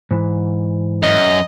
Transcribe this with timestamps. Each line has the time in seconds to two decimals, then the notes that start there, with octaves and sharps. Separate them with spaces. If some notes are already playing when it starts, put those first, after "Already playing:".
0.11 G#2 E3
1.03 F#2 D#5